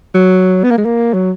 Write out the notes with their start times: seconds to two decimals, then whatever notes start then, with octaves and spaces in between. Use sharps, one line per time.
0.14 F#3
0.64 B3
0.71 A#3
0.78 G#3
0.85 A#3
1.14 F#3